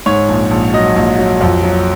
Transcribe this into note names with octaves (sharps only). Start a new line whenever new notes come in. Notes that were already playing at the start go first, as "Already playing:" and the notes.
G#2 C#5
A#1
A#1
F#3 D#5
A#1
F#3
F2
F#3